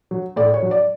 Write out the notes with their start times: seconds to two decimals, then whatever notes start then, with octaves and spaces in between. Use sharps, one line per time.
0.11 F#3
0.36 A2 D5
0.54 C#5
0.62 F#3
0.71 D5